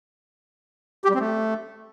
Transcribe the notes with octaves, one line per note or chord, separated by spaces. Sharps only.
G4
G3
C4
A3